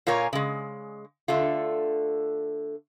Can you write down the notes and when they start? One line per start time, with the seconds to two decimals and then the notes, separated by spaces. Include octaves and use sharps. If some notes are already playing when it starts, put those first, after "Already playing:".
0.07 A#2 F4 A#4 C#5 G#5
0.33 C#3 G#3
1.28 D3 A3 F4